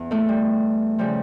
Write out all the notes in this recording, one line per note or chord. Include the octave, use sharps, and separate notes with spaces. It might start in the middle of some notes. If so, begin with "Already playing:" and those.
Already playing: E2
A2 A3
G3
C#3 F3 G3